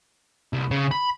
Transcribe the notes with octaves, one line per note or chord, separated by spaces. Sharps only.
C2
C#3
B5